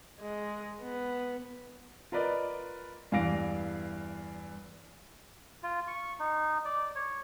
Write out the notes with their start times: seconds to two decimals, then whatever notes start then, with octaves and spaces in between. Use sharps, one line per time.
0.21 G#3
0.82 B3
2.12 F4 A#4 B4 D5 D#5
3.12 E2 G2 E3 F5 A#6 D7
5.63 F4
5.88 C#6
6.20 D#4
6.65 D5
6.95 C#5